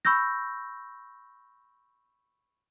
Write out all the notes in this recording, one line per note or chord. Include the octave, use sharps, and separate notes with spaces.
B5 C#6 E6 G6 A#6